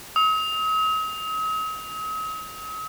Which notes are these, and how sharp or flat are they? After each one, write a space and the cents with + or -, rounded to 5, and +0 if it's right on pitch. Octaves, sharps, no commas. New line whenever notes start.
D#6 +45